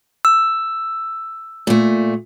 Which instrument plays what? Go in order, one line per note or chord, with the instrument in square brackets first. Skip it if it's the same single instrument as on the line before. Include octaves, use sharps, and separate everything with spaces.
[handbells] E6
[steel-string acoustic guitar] A#2 A3